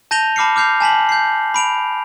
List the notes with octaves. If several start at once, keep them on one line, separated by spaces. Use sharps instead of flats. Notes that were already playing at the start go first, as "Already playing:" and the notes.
A5 G6 A#6 D#7 F7 G7
A5 B5 D6 F6 C7 C#7
D6 F6 G6 C7 F7
G#5 A5 B6 F#7
G6 C7
B5 D7 F7